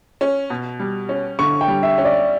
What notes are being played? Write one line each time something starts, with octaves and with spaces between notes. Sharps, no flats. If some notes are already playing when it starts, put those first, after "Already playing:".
C#4
B2
G3
C#4
D3 C#6
G5
G3
E5
C#4
D5